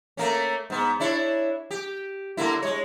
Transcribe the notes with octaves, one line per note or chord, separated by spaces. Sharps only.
A3 A#3 C#4
G#2 B3
D4 E4 C#5
G4
D3 A#3 E4
G#3 C#5